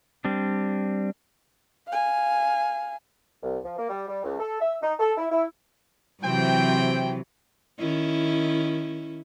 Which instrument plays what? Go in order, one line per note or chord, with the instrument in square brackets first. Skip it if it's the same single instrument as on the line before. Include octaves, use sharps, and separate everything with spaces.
[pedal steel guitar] G3 C4 D4
[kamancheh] F5 G#5
[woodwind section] C2
F3
A#3
G3
G3
C#2
A4
E5
D#4
A4
E4
E4
[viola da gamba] C3 E3 F#3 [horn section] C4 G5
[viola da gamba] D#3 C#4 E4